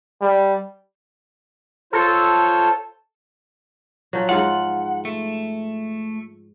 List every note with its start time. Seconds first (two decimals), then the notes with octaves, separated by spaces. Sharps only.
0.21 G3
1.93 F4 A4 C5 C#5
4.13 F3 F#3
4.29 G#2 F4 F#5
5.05 A3